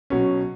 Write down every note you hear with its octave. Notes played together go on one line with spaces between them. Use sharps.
B2 F#3 C#4